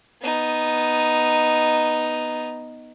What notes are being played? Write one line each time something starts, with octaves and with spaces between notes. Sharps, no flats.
B3 D#4